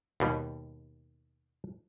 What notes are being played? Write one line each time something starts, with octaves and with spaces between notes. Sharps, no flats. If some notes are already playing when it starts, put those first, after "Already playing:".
D#2 B2 G3